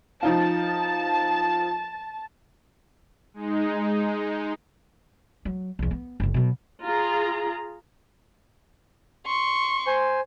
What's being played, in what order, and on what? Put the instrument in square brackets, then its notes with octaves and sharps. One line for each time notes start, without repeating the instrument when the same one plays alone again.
[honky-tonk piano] F3 D#4 F4 [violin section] A5
[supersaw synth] G#3 D#4
[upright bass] F#3
B1 E2
B3
F#1 C#2
B2 F#3
[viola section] F4 G#4 A#5
[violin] C6 C#6
[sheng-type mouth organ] C5 G#5